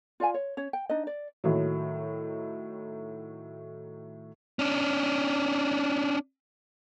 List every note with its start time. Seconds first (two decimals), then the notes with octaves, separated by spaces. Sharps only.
0.20 F4 D5 F5 G#5
0.34 C#5
0.57 C#4 C#5
0.73 G5
0.89 D4 D#4 D#5
1.07 D5
1.44 A2 D#3 F#3
4.59 C#4 D4